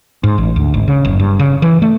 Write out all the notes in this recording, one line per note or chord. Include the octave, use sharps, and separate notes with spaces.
G#2
A1
D2
G#1
C#3
F#1
G2
C#3
E3
A3